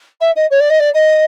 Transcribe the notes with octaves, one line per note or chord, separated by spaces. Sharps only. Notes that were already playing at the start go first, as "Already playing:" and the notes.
E5
D#5
C#5
D5
D#5
D5
D#5